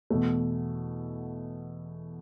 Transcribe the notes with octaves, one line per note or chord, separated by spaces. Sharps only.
E2 B2 A3